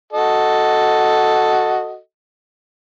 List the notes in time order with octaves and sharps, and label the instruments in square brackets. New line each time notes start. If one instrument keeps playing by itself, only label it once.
[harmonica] F#4 A4 D#5